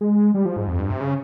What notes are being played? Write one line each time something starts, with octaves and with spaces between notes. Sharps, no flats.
G#3
G3
F3
G#2
F2
G2
C3
C#3